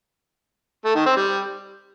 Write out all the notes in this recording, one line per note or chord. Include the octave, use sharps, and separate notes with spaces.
A3
D#3
C4
G3